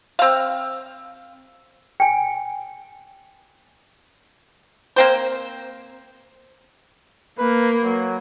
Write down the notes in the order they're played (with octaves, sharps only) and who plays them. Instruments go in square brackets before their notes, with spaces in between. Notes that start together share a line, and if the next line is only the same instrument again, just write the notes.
[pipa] C4 F5
[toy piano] G5 G#5
[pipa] A#3 C4 C5
[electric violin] A#3 [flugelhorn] B4
[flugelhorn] F#3